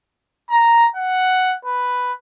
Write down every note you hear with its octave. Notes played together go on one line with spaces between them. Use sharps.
A#5
F#5
B4